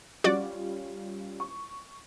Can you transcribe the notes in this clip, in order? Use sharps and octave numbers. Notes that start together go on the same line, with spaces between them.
G3 C#4 F4 F#4 D5
C#6